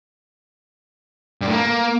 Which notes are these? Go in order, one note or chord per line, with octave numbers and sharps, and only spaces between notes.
G2
A2
A#3